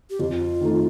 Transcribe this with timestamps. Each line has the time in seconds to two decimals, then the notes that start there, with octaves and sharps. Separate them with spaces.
0.10 G4
0.19 F2 F4
0.61 D#3 A3 D#4